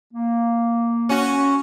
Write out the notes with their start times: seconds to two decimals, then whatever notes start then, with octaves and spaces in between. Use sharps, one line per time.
0.14 A#3
1.09 C#4 F#4